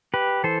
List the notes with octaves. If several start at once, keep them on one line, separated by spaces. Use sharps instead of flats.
G4 B4
E3 A4 C5